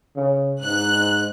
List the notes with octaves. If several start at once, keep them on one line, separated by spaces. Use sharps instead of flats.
C#3
G#2 F#6